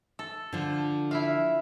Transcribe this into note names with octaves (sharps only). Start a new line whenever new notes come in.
A4
D3 F3
E4 E5 F5